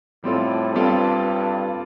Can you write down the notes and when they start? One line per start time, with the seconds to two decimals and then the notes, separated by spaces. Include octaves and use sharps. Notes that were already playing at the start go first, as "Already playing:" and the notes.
0.24 A2 G3 C4 F4 A4
0.74 G2 G3 C4 F4 A4